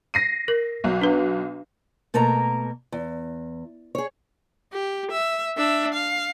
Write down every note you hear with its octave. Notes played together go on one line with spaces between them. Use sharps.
A#6 C7 D#7
A#4
B1 F#3
D4 B4
B2 A3 A#3 A#4 A#5
E2
G#4 C#5
G4
E5
D4 E5
F5